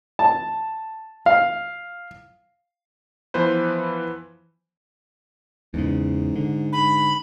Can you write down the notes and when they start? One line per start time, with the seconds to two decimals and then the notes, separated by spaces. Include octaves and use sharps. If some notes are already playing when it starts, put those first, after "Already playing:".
0.19 A5
1.26 F5
3.34 E3 F3 B3 B4 C5
5.74 E2 G#2 C#3
6.36 D3
6.73 G#2 B5